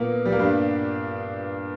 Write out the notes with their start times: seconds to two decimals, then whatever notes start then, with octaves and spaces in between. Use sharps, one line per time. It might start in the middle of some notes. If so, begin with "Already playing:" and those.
Already playing: A#2 A#3 B3
0.25 G3
0.32 A#3
0.39 G2 G3